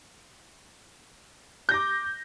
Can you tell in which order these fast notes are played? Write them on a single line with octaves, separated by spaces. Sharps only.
G6 A#6 D6